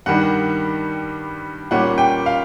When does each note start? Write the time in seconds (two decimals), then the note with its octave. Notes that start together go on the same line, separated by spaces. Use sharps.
0.06 G2 D#3 G3 F#5
1.71 A#2 G3 A#3 C#4 F#5
1.98 G5
2.26 F5